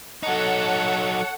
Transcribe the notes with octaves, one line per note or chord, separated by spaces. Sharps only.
F#3 D#4 A4 C#5 F#5